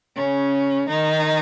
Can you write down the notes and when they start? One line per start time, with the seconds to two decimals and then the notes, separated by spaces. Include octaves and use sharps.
0.15 C#3 C#4
0.88 D#3 D#4